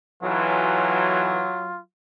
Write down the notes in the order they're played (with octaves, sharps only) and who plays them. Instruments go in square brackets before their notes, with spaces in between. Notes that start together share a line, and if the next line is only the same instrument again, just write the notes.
[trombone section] B1 E3 [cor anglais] F#3 [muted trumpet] F4